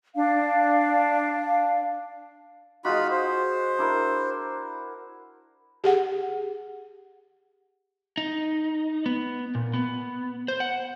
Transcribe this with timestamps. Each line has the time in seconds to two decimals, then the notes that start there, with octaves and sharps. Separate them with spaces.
0.15 D4 F5
2.85 G#3 D#4 F4 F#4 B5
3.11 C5
3.79 D4 E4 A#4
5.84 G4 G#4 F#5
8.17 D#4
9.06 B3
9.55 A#2
9.74 B3
10.48 C5
10.60 F#5